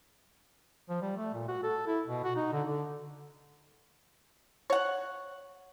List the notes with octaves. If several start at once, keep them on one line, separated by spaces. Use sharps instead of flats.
F3
G3
A3
A#2
F#4
A4
E4
B2
F#4
D#4
D3
D3
C#5 F#5